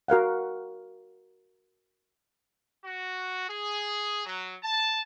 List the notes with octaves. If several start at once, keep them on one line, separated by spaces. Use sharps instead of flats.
F#4 A#4 F5 F#5
F#4
G#4
F#3
A5